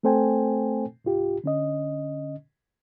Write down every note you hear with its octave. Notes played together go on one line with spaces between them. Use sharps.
A3 C4 A4 C5 G5 G#5
C2 G#2 F4 G4
D3 C#4 D#5